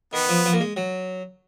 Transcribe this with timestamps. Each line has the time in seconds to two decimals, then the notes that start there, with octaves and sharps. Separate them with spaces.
0.13 D#3 B3
0.29 F3
0.46 F3
0.53 A#3
0.60 G#3
0.76 F#3